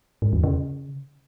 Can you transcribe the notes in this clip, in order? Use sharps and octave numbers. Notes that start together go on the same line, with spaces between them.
G#2
E2
C#3